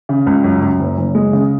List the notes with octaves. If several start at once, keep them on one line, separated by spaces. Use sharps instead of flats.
C#3
C#2
F#2
F#2
F#1
F#1
G#3
C#3